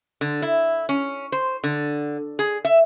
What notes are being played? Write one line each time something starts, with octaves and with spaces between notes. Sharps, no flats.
D3
E4
C#4
C5
D3
G#4
E5